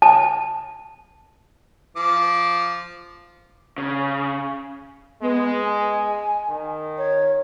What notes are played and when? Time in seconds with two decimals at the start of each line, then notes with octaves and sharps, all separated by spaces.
0.02 A5
1.97 F3 D6
3.78 C#3
5.22 G#3 B3
5.65 G#5
6.49 D#3
6.98 C#5